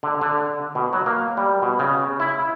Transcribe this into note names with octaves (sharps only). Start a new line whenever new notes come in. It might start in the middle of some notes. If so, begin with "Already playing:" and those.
D3
D3
B2
F#3
A#3
G3
B2
C#3
E4